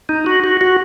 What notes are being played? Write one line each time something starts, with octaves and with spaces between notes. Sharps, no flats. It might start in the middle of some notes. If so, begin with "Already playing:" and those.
D#4
F#4
F#4
F#4